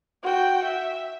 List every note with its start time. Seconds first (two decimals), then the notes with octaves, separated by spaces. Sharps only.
0.23 F#4 G5
0.64 E5